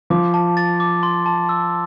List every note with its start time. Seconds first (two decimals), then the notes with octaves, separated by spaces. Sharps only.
0.10 F3 D6
0.34 A5
0.57 A6
0.80 D6
1.03 C6
1.26 A5
1.49 E6